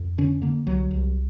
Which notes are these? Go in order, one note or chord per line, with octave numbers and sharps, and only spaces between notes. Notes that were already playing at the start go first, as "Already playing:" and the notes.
Already playing: F2
D3 C#4
D3 A#3
C2 F#3
C2